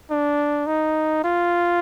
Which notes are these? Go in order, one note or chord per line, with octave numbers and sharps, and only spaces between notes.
D4
D#4
F4